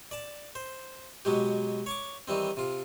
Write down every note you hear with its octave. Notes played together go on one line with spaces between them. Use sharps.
D5 A5
C5
B2 F#3 G#3 G4
C#5 C#6 D6
D#3 E3 G3 C4
C3 F4